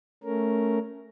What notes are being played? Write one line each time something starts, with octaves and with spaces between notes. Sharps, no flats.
A3 C#4 A#4